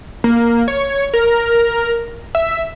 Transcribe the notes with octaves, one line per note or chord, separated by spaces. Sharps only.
A#3
C#5
A#4
E5